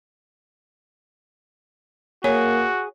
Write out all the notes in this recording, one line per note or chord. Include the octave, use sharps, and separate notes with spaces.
A#3 F#4 G#4 C#5